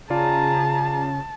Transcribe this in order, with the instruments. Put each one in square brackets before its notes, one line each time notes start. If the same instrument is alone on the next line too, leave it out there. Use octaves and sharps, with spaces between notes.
[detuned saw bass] C#3 [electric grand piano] F4 D5 [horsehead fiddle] G#4 A#5 [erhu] A5